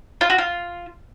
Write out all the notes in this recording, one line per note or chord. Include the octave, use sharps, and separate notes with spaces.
F4
F#4
F4